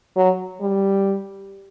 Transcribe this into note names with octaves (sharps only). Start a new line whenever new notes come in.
F#3
G3